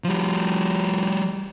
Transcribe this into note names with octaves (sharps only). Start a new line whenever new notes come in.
F3 G3